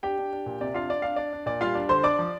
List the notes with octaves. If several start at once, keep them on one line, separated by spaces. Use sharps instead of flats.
D4 G4 G5
D4
D4
A#2
C3 D5
D4 F4 F5
D4 D5
D4 F5
D4 D5
D4
A#2 D5
G3 F4 F5
D4
D3 C5 C6
D4 D5 D6
F3